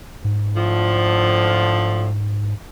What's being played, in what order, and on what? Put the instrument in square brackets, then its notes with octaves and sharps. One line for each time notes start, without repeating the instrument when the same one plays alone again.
[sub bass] G#2
[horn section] A2 D3 F3